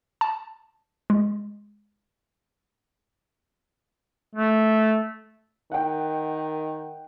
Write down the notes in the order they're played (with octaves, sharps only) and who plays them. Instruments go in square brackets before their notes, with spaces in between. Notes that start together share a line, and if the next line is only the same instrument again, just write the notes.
[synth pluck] A5
G#3
[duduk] A3
[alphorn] D#3 [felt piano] F#5 G5